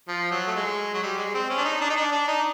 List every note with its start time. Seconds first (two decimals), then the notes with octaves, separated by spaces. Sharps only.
0.08 F3
0.32 F#3
0.47 A3
0.55 G#3
0.94 F#3
1.02 G3
1.17 G#3
1.34 C4
1.50 C#4
1.58 D4
1.65 D#4
1.81 D4
1.90 D#4
1.96 D4
2.12 D4
2.28 D#4